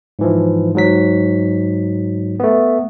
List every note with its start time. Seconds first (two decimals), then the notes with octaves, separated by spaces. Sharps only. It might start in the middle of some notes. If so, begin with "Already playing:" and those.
0.19 G#2 E3 F3
0.75 G#2 F#3 B6
2.40 A3 B3